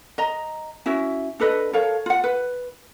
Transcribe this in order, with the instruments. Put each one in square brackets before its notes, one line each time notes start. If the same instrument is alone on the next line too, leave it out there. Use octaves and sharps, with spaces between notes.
[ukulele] D#5 A#5
C#4 E4 F#4 E5
D4 A4 B4 D#5
A4 A#4 C#5 F5
F4 F#5
B4